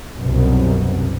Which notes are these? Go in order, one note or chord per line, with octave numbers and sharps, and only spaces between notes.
C2 F#2 B2